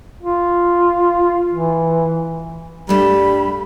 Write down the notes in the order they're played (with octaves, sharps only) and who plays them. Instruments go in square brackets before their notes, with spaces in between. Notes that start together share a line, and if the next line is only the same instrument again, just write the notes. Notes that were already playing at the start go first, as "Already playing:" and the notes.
[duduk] F4
E3
[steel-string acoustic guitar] G2 A3 [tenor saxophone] G3 [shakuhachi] B5